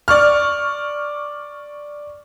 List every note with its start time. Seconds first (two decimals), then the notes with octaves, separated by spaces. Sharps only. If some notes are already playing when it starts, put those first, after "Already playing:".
0.08 D5 C#6 F6